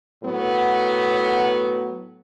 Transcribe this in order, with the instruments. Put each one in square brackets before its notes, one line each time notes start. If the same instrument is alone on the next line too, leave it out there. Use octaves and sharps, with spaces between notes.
[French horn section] A2 F#3 B3